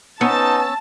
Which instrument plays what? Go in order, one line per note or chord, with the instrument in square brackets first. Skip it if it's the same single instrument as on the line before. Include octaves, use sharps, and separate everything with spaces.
[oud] B3 [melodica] C#4 E6 [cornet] D#4 [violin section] A5